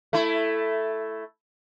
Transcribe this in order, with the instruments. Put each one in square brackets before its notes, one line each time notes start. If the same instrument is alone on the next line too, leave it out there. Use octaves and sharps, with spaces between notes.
[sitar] A3 E4